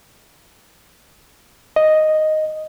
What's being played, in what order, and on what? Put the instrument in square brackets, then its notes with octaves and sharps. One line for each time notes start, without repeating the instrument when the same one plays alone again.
[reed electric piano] D#5